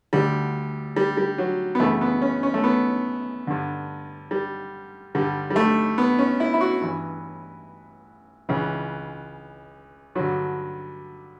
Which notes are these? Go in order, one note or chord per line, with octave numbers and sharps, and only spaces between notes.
D2 D3 G3
G3
G3
F#3
B3
F#2 C#3 E3 A3
B3
C#4
C#4
A3
B3
G2 D3
G3
G2 D3 G3
G3
A3
B3
C#4
E4
E4
F#4
G2 E3
C#2 C#3 E3
G2 D3 F#3